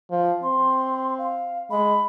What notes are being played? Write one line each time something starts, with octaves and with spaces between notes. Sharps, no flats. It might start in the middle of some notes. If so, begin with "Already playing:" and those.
F3
C4 C6
F5
G#3 B5